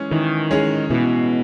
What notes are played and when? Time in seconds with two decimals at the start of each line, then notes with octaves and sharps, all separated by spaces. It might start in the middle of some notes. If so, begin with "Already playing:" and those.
Already playing: E3 G#3 C#4 G#4
0.11 D#3 E3
0.51 G#3 C#4 G#4
0.90 B2 E3